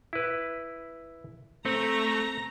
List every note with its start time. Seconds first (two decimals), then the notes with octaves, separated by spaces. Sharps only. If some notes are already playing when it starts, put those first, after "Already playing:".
0.13 E4 B4
1.66 A3 C4 A#5